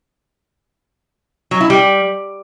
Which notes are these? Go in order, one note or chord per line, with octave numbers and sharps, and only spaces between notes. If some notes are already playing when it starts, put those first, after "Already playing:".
F#3
E4
G3